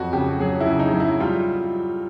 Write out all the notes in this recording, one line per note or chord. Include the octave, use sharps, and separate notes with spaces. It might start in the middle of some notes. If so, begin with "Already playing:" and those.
Already playing: F2 F#3 F#4
C#3 G4
F#3 G#4
E4
C#3
D#4
F#3
E4
G3 F4